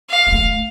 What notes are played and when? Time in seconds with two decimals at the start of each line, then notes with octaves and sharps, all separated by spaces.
0.10 F5
0.27 A#3
0.32 A3